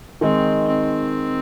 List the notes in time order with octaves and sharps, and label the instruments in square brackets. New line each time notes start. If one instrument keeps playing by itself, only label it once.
[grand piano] D#3 G#3 D#4 [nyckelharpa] C4
[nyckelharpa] C4